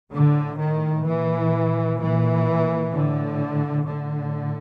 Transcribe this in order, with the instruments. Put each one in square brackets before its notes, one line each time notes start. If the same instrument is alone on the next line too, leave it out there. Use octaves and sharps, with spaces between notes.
[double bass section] A2 D3
D#3
A#2 E3
A#2 E3
A2 D3
A2 D3